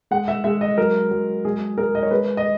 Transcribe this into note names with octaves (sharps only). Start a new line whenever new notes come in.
G#3 F#5
E5
G#3 E5
D#5
F#3 A#4
F#3
G#3 G#4
G#3 A#4
D#5
C#5
G#3 B4
D#5